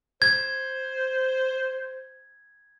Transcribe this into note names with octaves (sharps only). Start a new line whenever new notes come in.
C5 G#6